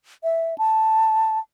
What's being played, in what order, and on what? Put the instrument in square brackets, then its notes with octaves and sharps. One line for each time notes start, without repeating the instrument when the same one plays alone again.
[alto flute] E5
A5